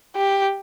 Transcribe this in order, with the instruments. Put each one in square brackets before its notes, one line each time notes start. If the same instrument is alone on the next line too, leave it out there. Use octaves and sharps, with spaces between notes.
[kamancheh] G4